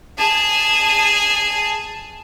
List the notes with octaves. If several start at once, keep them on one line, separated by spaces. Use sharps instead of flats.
G#4 A5